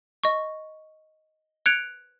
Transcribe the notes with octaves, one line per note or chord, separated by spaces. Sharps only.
D#5 C#6
F#6 G#6 C#7 D7 F7